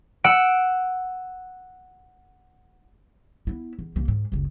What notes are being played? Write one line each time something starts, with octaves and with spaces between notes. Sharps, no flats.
F#5 E6 D7
B3 E4
E2
C2 A#3
G#2
F#1 C#2